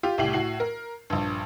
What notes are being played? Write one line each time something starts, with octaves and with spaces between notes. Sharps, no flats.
F4 G4
C2 A2 G4 C7 F#7
A2 F#4 C7 F#7
A#4
A#1 G2